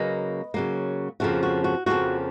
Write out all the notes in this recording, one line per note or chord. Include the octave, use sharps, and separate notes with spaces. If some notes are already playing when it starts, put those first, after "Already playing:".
Already playing: C#3 F#3 A#3 B4 D#5
C#3 F#3 A#3
F2 C#3 F3 A#3 F#4
F#4
F#4
F2 C#3 F3 A#3 F#4